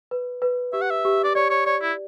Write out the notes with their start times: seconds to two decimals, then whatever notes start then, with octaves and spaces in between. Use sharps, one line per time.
0.11 B4
0.42 B4
0.73 G4 E5
0.82 F#5
0.91 E5
1.05 G4
1.24 D5
1.35 C#5 D5
1.50 C#5
1.66 C#5 D5
1.82 E4